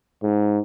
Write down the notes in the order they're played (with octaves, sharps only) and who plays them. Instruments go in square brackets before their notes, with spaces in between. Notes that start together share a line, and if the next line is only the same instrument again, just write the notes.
[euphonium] G#2